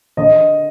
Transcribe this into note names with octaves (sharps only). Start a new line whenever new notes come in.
D3 D#5